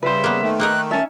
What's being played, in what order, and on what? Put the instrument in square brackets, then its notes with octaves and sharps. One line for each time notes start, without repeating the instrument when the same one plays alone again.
[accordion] C#3 G3 [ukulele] B4 C5 [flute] E5
[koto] A#3 B3
[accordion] D#3 A3
[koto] A#3 D#4 A#4 [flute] F#6
[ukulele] C#4 E5 [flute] A5